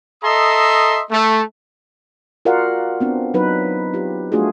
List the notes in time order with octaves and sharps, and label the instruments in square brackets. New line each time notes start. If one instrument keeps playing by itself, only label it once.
[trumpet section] A4 D#5 E5 A#5 C6 D#6
A3
[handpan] F4 F#4 A#4 D5 F5 F#5
B3 C4 D4
F#3 D#4 B4
F4 G4
G3 A3 D4 F4 F#4 G#4